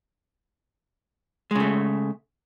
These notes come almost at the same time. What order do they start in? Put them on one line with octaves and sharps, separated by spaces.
G#3 C#3 A3